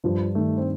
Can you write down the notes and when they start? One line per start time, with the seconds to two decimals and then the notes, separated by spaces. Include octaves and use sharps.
0.04 G2 F3
0.35 D#3 A3
0.57 C4